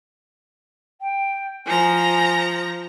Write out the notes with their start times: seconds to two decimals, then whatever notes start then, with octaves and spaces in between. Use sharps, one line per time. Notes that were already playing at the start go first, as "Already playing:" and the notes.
1.01 G5
1.66 F3 G#5 A#5